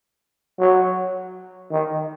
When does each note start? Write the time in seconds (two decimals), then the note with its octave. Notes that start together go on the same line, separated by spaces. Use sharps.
0.58 F#3
1.71 D#3